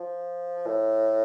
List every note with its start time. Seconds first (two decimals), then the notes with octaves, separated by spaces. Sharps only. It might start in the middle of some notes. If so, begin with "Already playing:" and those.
Already playing: F3
0.67 A2